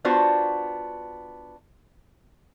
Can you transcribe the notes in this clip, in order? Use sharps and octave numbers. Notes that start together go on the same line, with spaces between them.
B3 D4 F4 F#4 C5